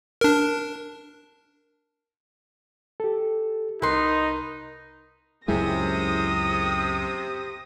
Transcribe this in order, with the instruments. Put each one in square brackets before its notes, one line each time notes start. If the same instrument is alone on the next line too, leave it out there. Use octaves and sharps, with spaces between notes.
[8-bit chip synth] D4 A#4
[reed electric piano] G4 A4
[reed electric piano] C2 A#4 [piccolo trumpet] D#4 [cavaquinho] B4 C6
[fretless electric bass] C#2 F#2 G#3 [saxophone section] C3 [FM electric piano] E4 G#4 [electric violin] D#6 A#6